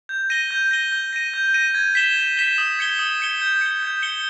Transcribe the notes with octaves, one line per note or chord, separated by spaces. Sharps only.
G6
A#6 D#7 G7
G6
A#6 D#7 G7
G6
A#6 D#7
G6
A#6 D#7
G#6
B6 E7 G7
G#6
B6 E7 G7
D#6
G#6 C#7 G7
D#6
G#6 C#7 G7
G6
C#7 G7
G6
C#7 G7